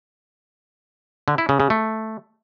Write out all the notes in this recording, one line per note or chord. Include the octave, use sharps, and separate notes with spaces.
D3
E4
C#3
C#3
A3